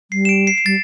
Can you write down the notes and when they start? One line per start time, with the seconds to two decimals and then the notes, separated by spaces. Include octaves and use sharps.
0.11 G3 C7
0.25 E7
0.29 D7
0.47 C7
0.58 C7
0.66 G3 A6